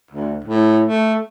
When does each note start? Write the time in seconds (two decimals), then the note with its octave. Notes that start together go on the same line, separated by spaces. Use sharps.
0.11 D2
0.44 A2
0.86 A3